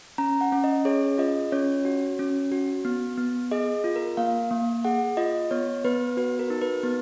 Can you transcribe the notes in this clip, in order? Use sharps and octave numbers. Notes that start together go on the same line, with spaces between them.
C#4 A#5
F#5
C#4
D#5
G#4 C#5
F4 D#5
C#4 C#5
F#4
C#4
F#4
B3
B3
G#4 D#5
F4
A#4
A#3 F5
A#3
G#4 F#5
F4 D#5
B3 C#5
B3 B4
F#4 B4
A#4
D#4
B4
B3